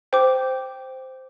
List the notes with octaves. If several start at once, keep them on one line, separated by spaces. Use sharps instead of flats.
C5 G5 D6